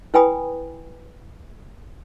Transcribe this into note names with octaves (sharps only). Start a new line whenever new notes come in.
E4 B4 G5 G#5 B5 D#6